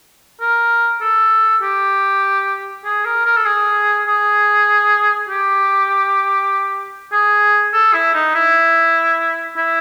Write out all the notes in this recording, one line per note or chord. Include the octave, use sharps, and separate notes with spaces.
A#4
A4
G4
G#4
A#4
A#4
A4
G#4
G#4
G4
G#4
A4
E4
D#4
E4
E4